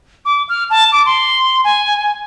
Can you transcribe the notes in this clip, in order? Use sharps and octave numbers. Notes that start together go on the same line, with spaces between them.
D6
F6
A5
D6
C6
G#5